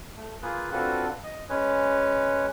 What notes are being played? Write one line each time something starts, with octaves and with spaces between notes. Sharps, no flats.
A3
A#3 F4 G#4 B4
C4 D4 F4 F#4 A4 B4
D#5
G#3 C#4 B4 C#5